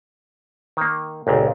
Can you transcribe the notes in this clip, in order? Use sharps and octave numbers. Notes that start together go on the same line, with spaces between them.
D#3 A#3
G1 C#2 A#2